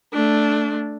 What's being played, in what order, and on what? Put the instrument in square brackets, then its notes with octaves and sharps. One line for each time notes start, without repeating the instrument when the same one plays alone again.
[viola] A3 D4